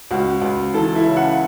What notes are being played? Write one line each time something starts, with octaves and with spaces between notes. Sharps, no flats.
C#2 F#4
C#2
E3 A4
E4
C#3
F#5